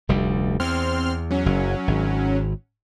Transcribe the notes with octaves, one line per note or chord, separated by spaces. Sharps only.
F1 D2 G3
E2 C4 C6 F6
F#3 C#4
F#1
G#1